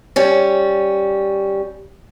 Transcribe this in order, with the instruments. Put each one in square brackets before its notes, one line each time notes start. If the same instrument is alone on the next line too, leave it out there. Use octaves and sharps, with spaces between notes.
[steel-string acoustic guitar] G3 C#4